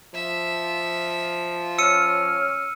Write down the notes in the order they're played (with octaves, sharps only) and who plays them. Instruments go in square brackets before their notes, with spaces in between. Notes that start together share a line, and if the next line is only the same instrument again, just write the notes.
[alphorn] F3 [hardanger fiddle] E5
[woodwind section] C#4 C#5 F6 [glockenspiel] E6 C#7 D#7